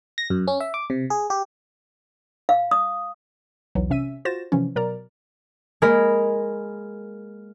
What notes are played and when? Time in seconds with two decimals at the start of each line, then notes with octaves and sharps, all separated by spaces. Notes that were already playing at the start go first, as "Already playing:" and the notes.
0.18 A#6
0.30 F#2
0.48 C#4
0.60 E5
0.74 D6
0.90 C3
1.10 G#4
1.30 G4
2.49 F5
2.71 D#6
3.75 B1 E2 E3 F#3
3.90 C3 C#4 E5 E6 D#7
4.25 F4 F#4 C5 A6 A#6 E7
4.52 C3 E3 F3 C#4
4.76 B2 F#3 A#4 D5 A#5
5.82 G#3 A#3 A#4 B5